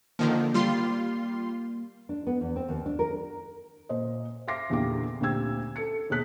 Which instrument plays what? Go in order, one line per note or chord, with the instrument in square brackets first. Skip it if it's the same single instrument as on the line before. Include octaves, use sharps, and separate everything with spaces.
[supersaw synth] D3 D#3 F3 [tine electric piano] A#3
[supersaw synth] G3 F4 C6
[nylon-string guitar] D4
B3
E2
C4
D#2
D4
A#4
[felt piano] A#2 C5 D#5
E5 F5 C6 D6 A#6 C7
E2 A#2 D3 G4 D6
D2 A#2 C4 G4 E6 G#6
A4 C#7
D#2 B2 G#4 F#6 B6